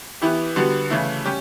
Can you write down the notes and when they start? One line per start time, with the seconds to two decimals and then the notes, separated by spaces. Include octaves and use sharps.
0.22 E3 B3 E4 G4
0.56 D3 G3 B3 F#4
0.90 C#3 E3 A3 E4
1.25 G3 C#4 G4